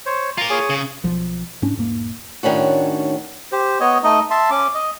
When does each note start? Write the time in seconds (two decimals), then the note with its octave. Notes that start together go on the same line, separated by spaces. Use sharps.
0.06 C5 C#5
0.38 F4 A#4 A#5
0.50 G#4 C#5 G#5
0.70 C#3
1.03 B1 F3
1.62 G#2 C#4 D4
1.77 E1 G#2 A#3
2.43 A2 D#3 C#4 D4 F#4
3.52 G4 C5
3.80 B3 C#5 D#5
4.03 A3 D#4 D#5
4.30 E5 A5 C6
4.50 C#4 D6
4.74 D#5